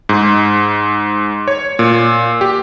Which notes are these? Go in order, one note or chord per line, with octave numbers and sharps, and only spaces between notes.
G#2
C#5
A#2
G4